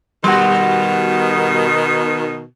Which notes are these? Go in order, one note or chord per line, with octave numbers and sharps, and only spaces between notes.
B2 D#3 G3 F#4